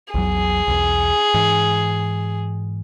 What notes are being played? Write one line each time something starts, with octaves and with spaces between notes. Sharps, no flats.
A#1 E2 F#3 G#4
B1 E2
G#2 E3